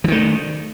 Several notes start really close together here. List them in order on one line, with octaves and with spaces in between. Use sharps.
F3 D#3 A3